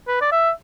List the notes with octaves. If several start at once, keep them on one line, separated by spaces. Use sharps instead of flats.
B4
D5
E5